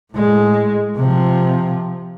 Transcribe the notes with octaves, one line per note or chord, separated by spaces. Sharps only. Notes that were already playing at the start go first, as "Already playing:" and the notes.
A2 G#3
C3 F3